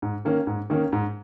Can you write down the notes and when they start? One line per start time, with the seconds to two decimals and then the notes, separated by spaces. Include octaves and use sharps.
0.02 G#2
0.25 D#3 A#3 C#4
0.47 G#2
0.70 D#3 A#3 C#4
0.93 G#2